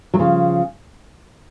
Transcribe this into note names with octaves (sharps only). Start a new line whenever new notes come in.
F#3
C#3 F3